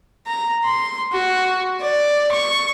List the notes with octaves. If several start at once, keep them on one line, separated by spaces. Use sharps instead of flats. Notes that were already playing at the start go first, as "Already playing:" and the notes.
A#5
C6
F#4
D5
C#6